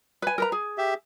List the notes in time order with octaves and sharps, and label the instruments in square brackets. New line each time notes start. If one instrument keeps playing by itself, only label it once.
[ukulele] B4 G#5
A#4 B4 A#5
G#4
[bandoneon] G4 E5